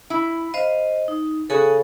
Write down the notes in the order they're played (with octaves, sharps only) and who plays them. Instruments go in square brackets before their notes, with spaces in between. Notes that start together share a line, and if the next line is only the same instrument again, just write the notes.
[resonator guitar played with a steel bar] E4
[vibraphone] C5 D#5 [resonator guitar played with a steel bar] F5
[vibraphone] D#4
[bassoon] C#3 [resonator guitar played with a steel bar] F#4 G#4 [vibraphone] A4